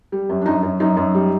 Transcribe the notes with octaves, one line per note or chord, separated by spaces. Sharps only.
G3
F#2
D4
F#2 D#4
F#2
F#2 D#4
F#2
G3